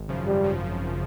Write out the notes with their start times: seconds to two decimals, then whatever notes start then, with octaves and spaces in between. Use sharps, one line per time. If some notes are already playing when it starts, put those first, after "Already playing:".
Already playing: G#1
0.09 F#2 C#3 F3
0.26 G#1 G3
0.44 C#3 F3